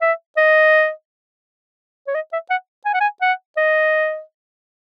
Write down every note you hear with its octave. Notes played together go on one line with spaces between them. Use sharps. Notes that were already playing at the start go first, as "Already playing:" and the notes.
E5
D#5
C#5
D#5
E5
F#5
G#5
F#5
G#5
F#5
D#5